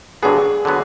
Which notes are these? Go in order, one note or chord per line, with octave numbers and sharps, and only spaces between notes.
G2 D3 F#3 B3 G#4
D3 F#3 B3